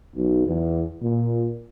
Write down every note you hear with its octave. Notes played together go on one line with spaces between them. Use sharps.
B1
E2
A#2